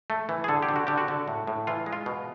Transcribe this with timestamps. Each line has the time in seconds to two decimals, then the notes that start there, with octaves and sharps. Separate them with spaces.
0.10 A3
0.29 E3
0.44 G#4
0.48 D3 A4
0.62 G4
0.69 D3
0.76 F#4
0.87 D3 G4
0.98 F#4
1.08 D3
1.28 A2
1.47 A2
1.67 E3 F4
1.86 G#3
1.93 F4
2.06 B2